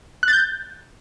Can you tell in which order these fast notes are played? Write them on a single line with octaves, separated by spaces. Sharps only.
F#6 A6 G6